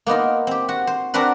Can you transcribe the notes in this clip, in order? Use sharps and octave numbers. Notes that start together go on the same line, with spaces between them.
A#3 B3 D#4 F4
C4 G4
F#4
C5
C4 D4 F#4 A#4 B4